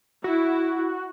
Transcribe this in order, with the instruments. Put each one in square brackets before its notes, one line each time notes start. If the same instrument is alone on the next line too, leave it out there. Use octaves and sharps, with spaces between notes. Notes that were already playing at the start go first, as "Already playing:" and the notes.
[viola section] E4 [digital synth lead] F#4